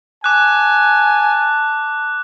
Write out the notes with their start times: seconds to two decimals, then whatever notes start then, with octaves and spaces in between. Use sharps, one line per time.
0.24 G#5 A5 D6 F#6